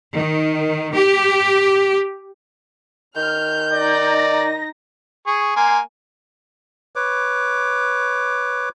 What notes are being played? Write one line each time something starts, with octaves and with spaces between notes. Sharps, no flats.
D#3
G4
D#3 F6 G6
D#4 D5 A#6
G#4 C#6
A#3 G#5 C6
B4 C#5 D6